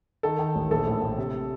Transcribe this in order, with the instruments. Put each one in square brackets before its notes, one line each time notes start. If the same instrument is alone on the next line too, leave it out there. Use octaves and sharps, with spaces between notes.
[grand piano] D#3 A4
D#3
A1
A#1 A4
A2
A2
C3